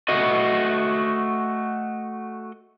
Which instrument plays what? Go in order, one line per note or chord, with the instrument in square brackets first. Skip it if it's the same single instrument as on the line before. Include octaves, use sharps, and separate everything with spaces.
[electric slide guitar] A3 F#4 D#5